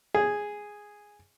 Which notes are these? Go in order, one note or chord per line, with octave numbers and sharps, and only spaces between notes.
G#4